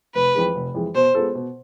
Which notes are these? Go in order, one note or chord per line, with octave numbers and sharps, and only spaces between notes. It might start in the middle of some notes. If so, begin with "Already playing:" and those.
F1 B4
F2 E3 G#3
F1
F2 E3 G#3
B2 C5
G#3 B3 F4 A4
B2